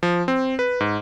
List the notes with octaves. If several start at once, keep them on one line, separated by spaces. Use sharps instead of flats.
F3
C4
B4
G#2